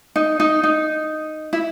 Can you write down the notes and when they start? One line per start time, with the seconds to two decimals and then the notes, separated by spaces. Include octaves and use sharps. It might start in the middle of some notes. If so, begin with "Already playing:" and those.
0.16 D#4
0.40 D#4
0.63 D#4
1.53 E4